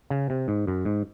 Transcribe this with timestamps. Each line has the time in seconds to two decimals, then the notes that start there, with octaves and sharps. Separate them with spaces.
0.10 C#3
0.30 C3
0.48 G#2
0.67 F#2
0.85 G#2